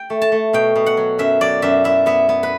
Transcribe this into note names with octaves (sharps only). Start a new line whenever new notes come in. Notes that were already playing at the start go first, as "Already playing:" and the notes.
Already playing: G5
A3
A5
A3
B2 G5
B2
F#5
F#3
F#2 E5
F#3 D5
F#2 E5
E4 E5
B3 E5
B3
B4